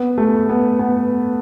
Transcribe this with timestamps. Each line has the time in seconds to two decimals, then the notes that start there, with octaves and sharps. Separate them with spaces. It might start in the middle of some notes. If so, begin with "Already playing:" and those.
Already playing: B3
0.18 A3
0.49 B3
0.79 B3